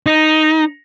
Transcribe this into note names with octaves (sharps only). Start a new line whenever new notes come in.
D#4